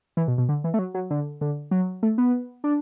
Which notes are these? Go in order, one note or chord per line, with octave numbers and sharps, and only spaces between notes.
E3
B2
B2
D3
E3
A3
F#3
F#3
D3
D3
F#3
A3
B3
D4